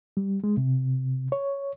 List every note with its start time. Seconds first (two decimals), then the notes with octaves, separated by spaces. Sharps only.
0.17 G3
0.44 G#3
0.57 C3
1.32 C#5